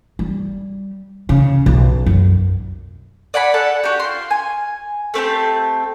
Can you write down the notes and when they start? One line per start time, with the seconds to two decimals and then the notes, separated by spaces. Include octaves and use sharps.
0.19 G3
1.29 C#3
1.66 B1
2.06 F#2
3.34 D5 F#5 G#5 B5
3.54 A4 F#5 A5
3.84 F#4 G4
4.00 F4 C6
4.31 G#5
5.14 A3 C4 G4 A5